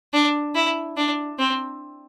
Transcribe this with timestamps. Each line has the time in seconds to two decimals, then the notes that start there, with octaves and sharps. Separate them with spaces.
0.13 D4
0.55 E4
0.97 D4
1.38 C4